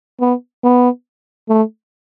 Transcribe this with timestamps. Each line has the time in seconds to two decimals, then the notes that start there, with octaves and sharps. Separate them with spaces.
0.21 B3
0.64 B3
1.49 A3